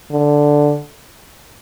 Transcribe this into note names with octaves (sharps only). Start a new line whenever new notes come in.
D3